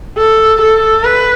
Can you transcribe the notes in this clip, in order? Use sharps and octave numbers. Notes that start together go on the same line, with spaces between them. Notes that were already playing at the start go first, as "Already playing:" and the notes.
A4
A4
B4